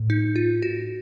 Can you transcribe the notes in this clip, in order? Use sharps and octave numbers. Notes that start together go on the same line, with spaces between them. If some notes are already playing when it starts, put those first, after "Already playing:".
Already playing: A2
D#4
F4
F#4